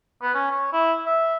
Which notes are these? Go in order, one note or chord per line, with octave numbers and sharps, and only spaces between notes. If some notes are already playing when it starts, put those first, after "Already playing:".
B3
C#4
C#5
E4
E5